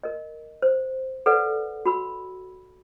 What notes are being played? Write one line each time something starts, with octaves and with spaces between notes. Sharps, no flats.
A#4 D#5
C5
A4 B4 D5 F#5
F#4 B5 E6